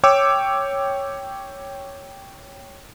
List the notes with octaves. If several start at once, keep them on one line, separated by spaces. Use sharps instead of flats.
C#5 G5 D6 E6